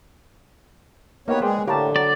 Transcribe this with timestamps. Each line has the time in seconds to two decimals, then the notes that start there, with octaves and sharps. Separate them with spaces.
1.28 A#3 B3 D#4 F#4 G4 B4 C#5
1.42 G#3 G#4 C5 D5 G5
1.68 A2 D3 G4 A#4 F5 A5
1.96 F#3 D5